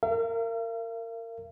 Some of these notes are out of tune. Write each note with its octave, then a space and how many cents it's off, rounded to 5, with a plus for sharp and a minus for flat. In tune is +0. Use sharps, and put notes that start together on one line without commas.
A#4 -25 F5 -45